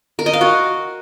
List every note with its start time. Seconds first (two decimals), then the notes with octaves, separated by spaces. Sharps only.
0.19 A#4
0.26 D#5
0.33 F5
0.41 F#4